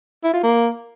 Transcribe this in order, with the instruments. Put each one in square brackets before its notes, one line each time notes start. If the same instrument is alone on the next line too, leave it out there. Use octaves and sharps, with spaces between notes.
[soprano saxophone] E4
F4
A#3